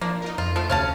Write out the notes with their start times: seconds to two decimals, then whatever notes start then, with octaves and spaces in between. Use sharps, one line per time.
0.01 F3 A#3 D4
0.22 D#4 F4 A#4
0.38 F2 F4
0.56 F3 A3 F4
0.69 D2 C3 C#4 F5 A5